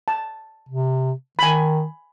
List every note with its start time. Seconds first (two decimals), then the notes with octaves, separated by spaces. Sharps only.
0.08 A5
0.69 C3
1.39 D#3 G#5 B5